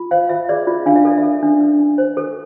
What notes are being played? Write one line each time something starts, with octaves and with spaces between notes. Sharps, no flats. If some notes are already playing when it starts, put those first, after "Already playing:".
Already playing: F4
C5 F5
F4 E5
G#4 D5
F4 D5
D4 F5
E5
A4 D5
E5
A4
D4
D4
D4
C5
A4